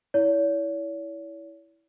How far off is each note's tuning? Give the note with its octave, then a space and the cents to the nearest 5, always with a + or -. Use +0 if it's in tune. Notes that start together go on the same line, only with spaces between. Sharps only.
E4 -10 C#5 +40